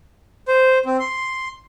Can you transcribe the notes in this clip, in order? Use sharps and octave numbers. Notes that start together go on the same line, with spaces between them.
C5
C4
C6